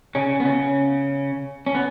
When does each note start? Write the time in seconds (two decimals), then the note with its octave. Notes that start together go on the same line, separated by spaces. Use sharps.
0.15 C#3 C#4
0.40 B3
0.45 C#3 C#4
1.66 C#4
1.75 B3